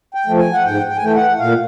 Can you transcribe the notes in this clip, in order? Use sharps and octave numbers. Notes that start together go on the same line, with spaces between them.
G5
F3 A3
G#5
F#5
G#2 G5
G5
G#5
E3 A3 G5
F#5
A#2 F5